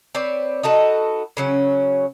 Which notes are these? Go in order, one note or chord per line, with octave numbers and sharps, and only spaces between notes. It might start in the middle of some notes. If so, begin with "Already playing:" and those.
C4 B4 C#5 D5
D#4 F#4 A4 B4
C#3 F#3 C#4